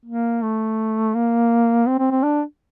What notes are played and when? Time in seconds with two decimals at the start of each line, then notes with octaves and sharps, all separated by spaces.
0.05 A#3
0.42 A3
1.15 A#3
1.87 C4
1.99 C4
2.11 C4
2.23 D4